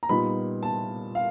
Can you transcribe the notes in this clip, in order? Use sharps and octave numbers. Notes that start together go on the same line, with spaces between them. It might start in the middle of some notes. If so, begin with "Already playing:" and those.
A#5
A#2 G3 B3 D#4 B5
A5
F5